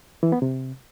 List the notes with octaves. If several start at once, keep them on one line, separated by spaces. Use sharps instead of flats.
E3
B3
C3